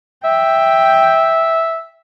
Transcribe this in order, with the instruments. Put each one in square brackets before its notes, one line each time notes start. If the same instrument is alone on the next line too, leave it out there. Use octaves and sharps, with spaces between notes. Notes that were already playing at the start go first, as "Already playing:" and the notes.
[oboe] E5 [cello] G5